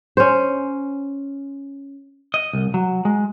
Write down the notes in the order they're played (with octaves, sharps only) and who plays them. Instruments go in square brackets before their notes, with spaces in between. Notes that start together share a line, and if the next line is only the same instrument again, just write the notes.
[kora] C#4 C5
[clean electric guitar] D#5
C2
F#3
G#3